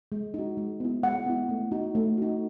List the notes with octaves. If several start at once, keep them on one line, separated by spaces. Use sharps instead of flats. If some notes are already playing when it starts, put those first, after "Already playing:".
G#3
D#4 F#4
G#3
B3 E4
G#3 F#5
B3 E4
A3
D#4 F#4
A3
D#4 F#4